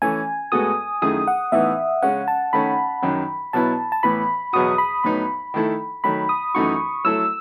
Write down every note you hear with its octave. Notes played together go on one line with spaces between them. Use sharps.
E3 A3 C#4 G#5
A2 G#3 B3 F#4 A4 D#6
F#2 D#3 A3 E4 G#4 D#6
F#5
A2 E3 B3 D#4 E5
C#3 G#3 C#4 F#5
A5
D#3 A3 C#4 B5
F#2 D#3 F#3
B2 F#3 B3 E4 A5
A5
A2 E3 B3 B5
E2 B2 F#3 B3 F#4 D#6
B5
A2 F#3 B3 D#4 B5
D#3 A3 E4 A4
D#3 F#3 A3 B5
D#6
F#2 E3 A3 D#4 F#4 C#6
F#3 A3 E4 A4 E6